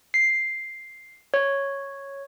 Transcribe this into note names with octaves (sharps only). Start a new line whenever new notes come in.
C7
C#5